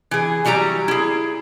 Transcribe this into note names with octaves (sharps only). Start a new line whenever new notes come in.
E3 G#4
E3 F#3 G3 G4 A#5
E4 G#4